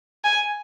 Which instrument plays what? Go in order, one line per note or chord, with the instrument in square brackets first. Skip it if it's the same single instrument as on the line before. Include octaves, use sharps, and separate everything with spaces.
[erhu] G#5